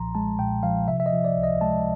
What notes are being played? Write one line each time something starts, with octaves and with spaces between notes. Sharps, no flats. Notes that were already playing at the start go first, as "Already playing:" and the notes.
Already playing: B1 A#2 F3 A#5 C6
G#3 A5
A#2 G5
F3 F5
C3 E5
E5
D#5
F3
D5
C#2
D#5
G#3 A5